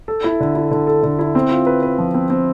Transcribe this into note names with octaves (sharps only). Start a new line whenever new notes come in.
A4
E4
D3
E4
D3
A4
D3
E4
C4
F4
B4
B4
F3
C4
C4